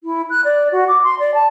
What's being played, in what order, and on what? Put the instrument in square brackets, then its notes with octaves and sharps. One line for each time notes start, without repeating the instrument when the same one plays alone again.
[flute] E4
F#6
D5
F#4
D6
C6
D5
A5